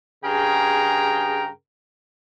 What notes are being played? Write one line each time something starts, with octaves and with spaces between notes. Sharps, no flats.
G2 C#3 G#4 A#4 G5 A#5